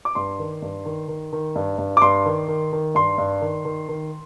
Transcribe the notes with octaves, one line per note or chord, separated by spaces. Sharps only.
D6
G2 C6
D#3
G2
D#3
D#3
D#3
G2
G2
D6
G2 C6
D#3
D#3
D#3
G2 C6
G2
D#3
D#3
D#3